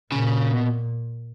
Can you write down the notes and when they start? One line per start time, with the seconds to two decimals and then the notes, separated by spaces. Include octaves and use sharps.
0.12 A#2 C#3
0.53 B2